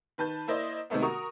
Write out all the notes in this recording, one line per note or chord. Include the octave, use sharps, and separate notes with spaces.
D#3 B4 A5 G6
A#3 E4 C5 D5 D#5
C3 D#3 G#3 A3 B3
F#4 A#4 A#5 C#6 D#6